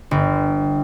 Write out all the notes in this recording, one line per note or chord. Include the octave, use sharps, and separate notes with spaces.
G1